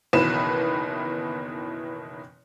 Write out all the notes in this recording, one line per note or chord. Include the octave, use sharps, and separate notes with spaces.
F#1 B2 D#3 E3 B4 E7